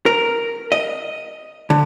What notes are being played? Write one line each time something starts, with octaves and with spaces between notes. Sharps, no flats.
A#4
D#5
D3